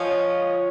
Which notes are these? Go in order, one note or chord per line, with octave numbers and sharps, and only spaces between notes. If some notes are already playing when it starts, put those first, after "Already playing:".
Already playing: F3 C#4 F4 D#5
C#5